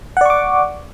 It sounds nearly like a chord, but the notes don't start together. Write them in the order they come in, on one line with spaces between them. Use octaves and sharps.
F#5 D5 C#6 D6